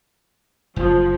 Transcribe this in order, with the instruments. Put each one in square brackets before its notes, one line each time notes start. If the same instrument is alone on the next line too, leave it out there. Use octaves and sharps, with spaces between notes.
[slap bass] F#1 [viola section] F3